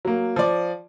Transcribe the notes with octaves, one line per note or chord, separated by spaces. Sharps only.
F#3 A#3
F3 D5